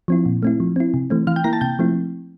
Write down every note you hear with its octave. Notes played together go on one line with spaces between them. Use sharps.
F3 C4 E4
A#2
A3 C4 E4
F3
C4 E4
C3
E3 A3 C4
E3 F5 F6
G5 G6
A#3 E4 A#5 A#6
A5 A6
C3 G5 G6
F3 A3 C4 E4